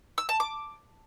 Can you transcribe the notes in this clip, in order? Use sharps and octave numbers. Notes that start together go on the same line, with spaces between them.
E6
A5
D6